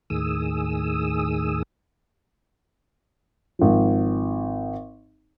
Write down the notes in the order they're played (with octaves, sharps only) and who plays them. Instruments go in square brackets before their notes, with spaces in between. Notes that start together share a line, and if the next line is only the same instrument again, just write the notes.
[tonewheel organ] D#2 A2 D#3 G#4 D#6 E6
[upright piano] G#1 F3